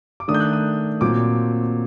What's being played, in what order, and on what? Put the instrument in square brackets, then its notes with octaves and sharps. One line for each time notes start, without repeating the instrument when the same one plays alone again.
[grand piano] D6
D#3 A3 D4 D#6
G6
F#6
D#6
A#2 F#3 C4 D6